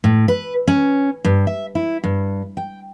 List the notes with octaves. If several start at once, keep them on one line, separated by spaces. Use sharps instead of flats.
A2
B4
C#4
G2
E5
E4
G2
G5